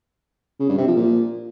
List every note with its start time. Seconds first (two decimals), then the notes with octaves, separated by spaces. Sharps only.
0.60 C#3
0.69 G2
0.78 C3
0.87 F3
0.96 A#2